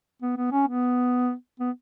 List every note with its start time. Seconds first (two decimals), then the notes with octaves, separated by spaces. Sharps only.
0.22 B3
0.37 B3
0.52 C#4
0.68 B3
1.60 B3